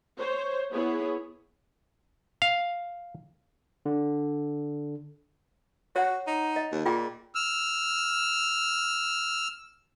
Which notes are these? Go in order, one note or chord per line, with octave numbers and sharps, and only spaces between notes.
C5 C#5
B3 E4 G#4 C#5
F5
D3
F#4 C#5 F#5
D#4
D#5
D#2
A#2 F4 G#4 G5
E6 F6